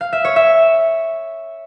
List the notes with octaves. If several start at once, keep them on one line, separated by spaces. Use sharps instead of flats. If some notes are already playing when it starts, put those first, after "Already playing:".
F5
E5
C#5
E5